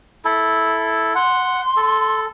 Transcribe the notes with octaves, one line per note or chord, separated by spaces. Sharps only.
E4 A4
F#5 C6
A4